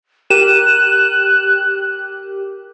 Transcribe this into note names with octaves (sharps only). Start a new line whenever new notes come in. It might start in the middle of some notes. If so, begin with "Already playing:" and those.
G4 A#4 F#6 D#7 E7